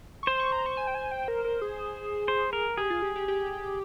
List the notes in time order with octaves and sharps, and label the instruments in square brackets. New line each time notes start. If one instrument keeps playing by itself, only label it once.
[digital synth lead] C#6
[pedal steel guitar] C5 [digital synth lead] C6
[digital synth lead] C#6
A#5
C#6
G#5
G5
G#5
G5
A#4
A#4
G#4
[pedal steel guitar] C5
A#4
[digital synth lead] G4 [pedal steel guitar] G#4
[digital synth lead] F4
G4
G4
G4